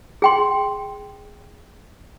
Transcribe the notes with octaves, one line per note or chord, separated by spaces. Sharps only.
G#4 G5 C6